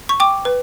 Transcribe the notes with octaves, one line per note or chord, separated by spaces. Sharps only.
C#6
G5 D6
B4